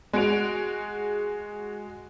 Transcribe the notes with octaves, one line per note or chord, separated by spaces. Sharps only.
G#3 F#4 D7 F7